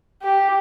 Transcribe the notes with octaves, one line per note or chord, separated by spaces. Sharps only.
G4